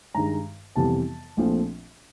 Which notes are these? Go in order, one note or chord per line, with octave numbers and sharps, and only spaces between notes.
G2 D#3 G#3 A#5
F2 C3 E3 G3 B3 A5
A#1 A#2 F3 A3 C4